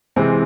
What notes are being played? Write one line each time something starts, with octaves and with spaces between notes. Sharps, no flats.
C3 E3 G#3 C4